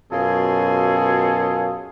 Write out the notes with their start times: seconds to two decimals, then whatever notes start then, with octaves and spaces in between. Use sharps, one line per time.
0.12 F#2 B2 F4 G#4 A4